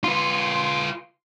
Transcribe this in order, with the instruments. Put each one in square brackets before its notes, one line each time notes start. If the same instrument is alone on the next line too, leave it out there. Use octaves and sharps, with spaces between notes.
[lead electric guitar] F4 B4 [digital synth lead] C6